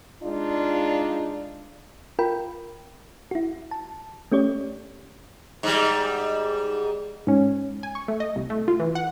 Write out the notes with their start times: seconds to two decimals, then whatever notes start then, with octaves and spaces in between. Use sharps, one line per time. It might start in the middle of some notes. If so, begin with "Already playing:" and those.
0.23 G#3 D4 D#4 F4
2.19 F4 A#4 G5 B5
3.31 E4 F#4
3.71 A5
4.32 A3 C#4 G4 C#5 D5
5.63 G#2 G3
7.27 G#2 C#4
7.83 G#5
7.95 C#6
8.08 A3
8.20 D#5
8.36 C2
8.50 A3
8.68 F4
8.80 E3
8.95 F#5